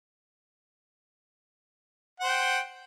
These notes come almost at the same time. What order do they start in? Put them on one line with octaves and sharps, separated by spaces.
F#5 C5 G5